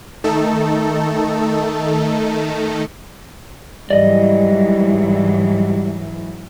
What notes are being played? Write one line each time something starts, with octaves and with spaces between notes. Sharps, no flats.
D#3 A3 D#4 A4
G#2 E3 F#3 G3 D5 D#5